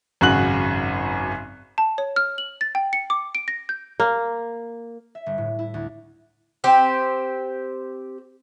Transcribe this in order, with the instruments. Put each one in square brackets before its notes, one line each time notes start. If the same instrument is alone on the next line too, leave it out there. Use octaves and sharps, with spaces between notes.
[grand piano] G#1 F#2 C#3 F#4 F#6 F#7
[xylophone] A5
C#5
F6
F#7
A6
G5
C#7
D6
D7
A#6
G6
[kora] A#3
[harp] E5
G1
A2
E4
D2
[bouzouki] C4 G4 C5